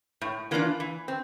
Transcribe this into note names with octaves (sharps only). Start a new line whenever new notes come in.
A2
E3 A#3 D4 F4
E3
C4